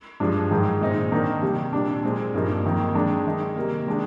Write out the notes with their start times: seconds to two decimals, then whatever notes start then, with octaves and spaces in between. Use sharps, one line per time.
0.20 G2 F3 G#3 D4
0.51 G#2 D#3 G#3
0.81 A#2 G#3 C4 D#4
1.12 D#3 A#3 D4
1.42 C3 D#3 G3
1.73 A#2 G3 D4
2.03 A#2 G#3 C4
2.34 G2 F3 A#3 D#4
2.64 F2 D#3 A#3
2.95 D#3 G#3 D4
3.25 D#3 G#3 D#4
3.56 C3 G3 A#3
3.87 D#3 G#3 D4